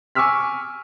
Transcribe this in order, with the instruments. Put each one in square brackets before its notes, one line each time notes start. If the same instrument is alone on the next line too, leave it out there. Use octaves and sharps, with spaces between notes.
[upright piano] G#5 C#6 D6 E6 F6 B6